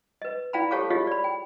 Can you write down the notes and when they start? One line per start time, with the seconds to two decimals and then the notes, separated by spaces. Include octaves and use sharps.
0.22 B4 D#5
0.53 E4 D5 F5 G5 A#5 B5
0.71 G4 A4 C#5 F5 A5 D6
0.90 F4 G4 G#4 C#5 D#5 F5
1.07 D5 B5
1.24 G5